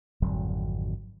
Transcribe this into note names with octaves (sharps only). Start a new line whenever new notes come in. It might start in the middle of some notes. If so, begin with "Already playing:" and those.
G#1 F2 D3 F#3